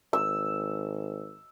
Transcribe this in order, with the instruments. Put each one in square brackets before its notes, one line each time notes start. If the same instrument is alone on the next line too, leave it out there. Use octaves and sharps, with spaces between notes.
[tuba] G#1 [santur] E6